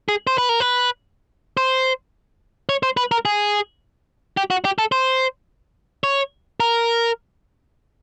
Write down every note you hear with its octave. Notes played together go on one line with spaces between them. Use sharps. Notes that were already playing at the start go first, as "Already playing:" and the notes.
G#4
C5
B4
A#4
B4
C5
C#5
C5
B4
A#4
G#4
G4
F#4
G4
A4
C5
C#5
A#4